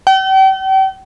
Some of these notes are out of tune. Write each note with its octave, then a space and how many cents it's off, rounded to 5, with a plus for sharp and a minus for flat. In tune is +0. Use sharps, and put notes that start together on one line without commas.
G5 -40